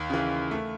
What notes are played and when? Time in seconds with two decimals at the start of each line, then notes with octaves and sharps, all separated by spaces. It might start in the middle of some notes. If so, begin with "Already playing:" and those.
Already playing: D#2
0.10 C#3 E3
0.51 A3